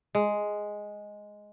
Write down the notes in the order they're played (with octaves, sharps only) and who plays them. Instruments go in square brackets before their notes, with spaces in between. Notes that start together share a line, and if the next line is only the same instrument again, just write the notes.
[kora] G#3